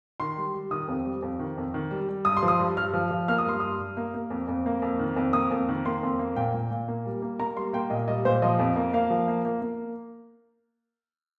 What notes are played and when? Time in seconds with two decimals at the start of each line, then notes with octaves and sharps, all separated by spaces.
0.20 D#3 C6
0.37 G3
0.54 G3
0.71 D#3 D#6
0.88 F2
1.05 G3
1.22 F2
1.39 D#3
1.57 F2
1.74 D#3
1.91 G3
2.09 G3
2.25 G2 D#6
2.37 C6
2.43 F3
2.48 D#6
2.59 G2
2.77 G2 F6
2.94 F3
3.11 F3
3.28 A#3 F6
3.38 D#6
3.46 G2 C6
3.60 G2 D#6
3.80 G2
3.97 A#3
4.14 A#3
4.30 F2
4.48 F2
4.66 A#3
4.82 F2
4.99 D#3
5.16 F2
5.33 A#3 D#6
5.51 F2
5.69 D#3
5.85 A#3 C6
6.03 F2
6.19 A#3
6.36 A#2 G5
6.54 A#2
6.71 A#2
6.88 A#3
7.06 G3
7.22 A#3
7.40 A#3 A#5
7.57 G3 C6
7.73 A#3 G5
7.90 A#2 D#5
8.08 G3 D#5
8.25 A#2 C5
8.42 F3 D#5
8.59 F2
8.76 A#3
8.93 A#3 F5
9.10 F3
9.28 A#3
9.45 A#3
9.62 A#3